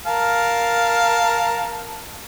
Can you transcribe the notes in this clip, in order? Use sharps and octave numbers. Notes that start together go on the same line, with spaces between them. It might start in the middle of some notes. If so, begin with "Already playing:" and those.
A#4 F5 A5